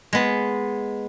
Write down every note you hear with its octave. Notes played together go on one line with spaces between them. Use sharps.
G#3 B3